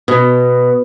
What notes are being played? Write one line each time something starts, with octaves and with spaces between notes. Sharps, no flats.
B2